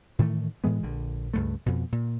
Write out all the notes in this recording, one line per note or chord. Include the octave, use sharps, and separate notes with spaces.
A2 D#3 E3 A3
A2 E3 G#3 B3
A#1 D3
C#2 G2 A3
F2 B2
A#2